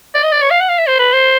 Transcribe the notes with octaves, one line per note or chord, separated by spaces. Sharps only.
D5
D#5
D5
C#5
F5
F#5
F5
E5
C5
B4
C5